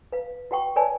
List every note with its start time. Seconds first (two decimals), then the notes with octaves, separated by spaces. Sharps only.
0.12 B4 F5
0.51 F#4 B4 F#5 G5 C#6
0.76 A#4 B4 C#5 D5 G#5 A5